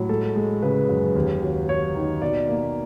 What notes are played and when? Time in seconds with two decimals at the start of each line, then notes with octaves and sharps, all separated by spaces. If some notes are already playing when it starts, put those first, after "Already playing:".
Already playing: A2 F#3
0.09 G#3 A4
0.36 G#3
0.62 C#3 B4
0.89 F#2
1.15 D#2
1.42 F#3
1.68 F#3 C#5
1.95 D#3
2.22 B2 D5
2.48 A#3